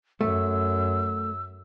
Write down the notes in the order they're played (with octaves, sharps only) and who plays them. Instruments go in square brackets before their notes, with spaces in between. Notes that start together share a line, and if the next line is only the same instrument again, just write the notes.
[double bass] F#2 [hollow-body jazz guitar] A3 [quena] E6